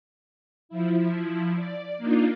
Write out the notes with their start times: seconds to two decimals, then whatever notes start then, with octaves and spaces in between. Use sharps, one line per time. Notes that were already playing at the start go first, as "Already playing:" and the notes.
0.69 F3 E4
1.56 D5
1.98 A#3 D4 D#4 F4